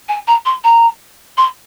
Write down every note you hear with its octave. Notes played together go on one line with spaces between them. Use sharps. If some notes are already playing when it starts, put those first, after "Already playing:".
G#5
A#5
C6
A#5
C6